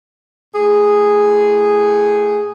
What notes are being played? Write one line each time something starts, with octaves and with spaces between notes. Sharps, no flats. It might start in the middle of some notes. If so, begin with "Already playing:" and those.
A2 G#4